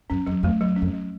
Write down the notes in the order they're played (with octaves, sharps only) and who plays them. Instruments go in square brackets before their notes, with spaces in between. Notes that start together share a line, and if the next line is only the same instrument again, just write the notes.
[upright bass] F#2 [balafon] C#4
[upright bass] F2 [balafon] F#3
[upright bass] F2 [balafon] A3
[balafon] F#3
C#4
[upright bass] F2
[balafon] F#3